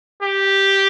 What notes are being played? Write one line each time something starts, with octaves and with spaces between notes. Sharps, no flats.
G4